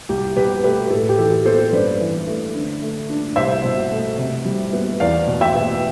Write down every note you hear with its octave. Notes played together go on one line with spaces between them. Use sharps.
C2 G4
B2 G4 B4
A3 G4 B4
A2 A4
G4
E3 A4
B3 A4 C5
G2 B4 D5
E3
A3
D3
A3
D4
C2 C5 E5
B2
A3
C3
G3
B3
E2 D5 F5
B2
E5 G5
B3